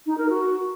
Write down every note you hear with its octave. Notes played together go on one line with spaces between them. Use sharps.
D#4
A#4
F#4